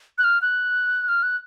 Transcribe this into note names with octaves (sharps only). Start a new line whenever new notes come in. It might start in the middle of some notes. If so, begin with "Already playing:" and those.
F#6
F6
F#6
F6
F#6